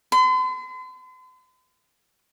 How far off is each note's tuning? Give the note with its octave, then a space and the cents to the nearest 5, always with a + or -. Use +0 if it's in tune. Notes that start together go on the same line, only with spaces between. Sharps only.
C6 -45